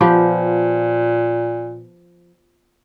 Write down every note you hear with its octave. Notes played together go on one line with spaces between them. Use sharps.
A#2 F3 B3 G4